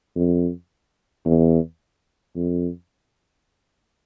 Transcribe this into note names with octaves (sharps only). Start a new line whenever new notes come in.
F2
E2
F2